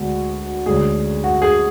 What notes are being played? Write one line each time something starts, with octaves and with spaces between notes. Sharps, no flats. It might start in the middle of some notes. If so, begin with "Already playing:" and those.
Already playing: D2 D3 G#3 B3 D4 F#4
D2 D3 G#3 C#4 G#4
F#4
G#4